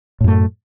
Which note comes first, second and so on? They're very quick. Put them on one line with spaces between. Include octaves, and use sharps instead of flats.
A2 F#2 A3